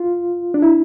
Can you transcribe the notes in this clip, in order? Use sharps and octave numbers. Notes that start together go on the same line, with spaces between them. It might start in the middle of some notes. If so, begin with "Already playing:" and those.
Already playing: F4
D4
E4